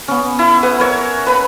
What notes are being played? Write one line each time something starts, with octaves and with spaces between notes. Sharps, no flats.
B3 C#4
E4
B4 F#5 D#6
A#4 C#5 E5
B4 B5